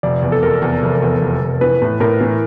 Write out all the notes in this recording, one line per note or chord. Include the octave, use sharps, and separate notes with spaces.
F1 D5
E2
A4
F1 A#4
E2
F1
E2
F1
F1
E3 B4
A2
A2 A#4
E3